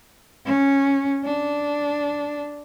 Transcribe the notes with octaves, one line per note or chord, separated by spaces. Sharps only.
C#4
D4